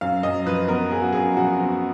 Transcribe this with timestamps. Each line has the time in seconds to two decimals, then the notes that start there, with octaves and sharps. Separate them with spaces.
0.01 F#2 F5
0.23 F#2 D#5
0.46 F3 B4
0.68 B3 A#4
0.92 F#2 G#4
1.02 F#4
1.13 F#2 G#4
1.37 F3 F#4
1.59 B3